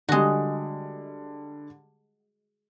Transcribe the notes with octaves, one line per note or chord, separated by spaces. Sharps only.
D3 G3 G#3 F#4